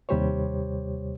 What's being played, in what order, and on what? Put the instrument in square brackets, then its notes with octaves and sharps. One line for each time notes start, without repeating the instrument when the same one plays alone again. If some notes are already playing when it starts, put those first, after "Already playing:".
[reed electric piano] D#2 C3 G3 G4 C5 C#5